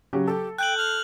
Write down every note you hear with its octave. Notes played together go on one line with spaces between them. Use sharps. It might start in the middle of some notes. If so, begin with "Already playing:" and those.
C#3 F#3 G4
G4 A4
G5 F#6 G6 F#7
F6